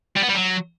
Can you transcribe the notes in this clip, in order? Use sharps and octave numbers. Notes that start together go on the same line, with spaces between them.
G3
B3
G3
F#3